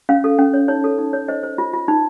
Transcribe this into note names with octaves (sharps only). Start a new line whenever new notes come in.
C#4 F5
A4
C#4
C#5
D#4 C#5
A4
D#4
C#5
C5 D#5
C5
F4
F4
D#4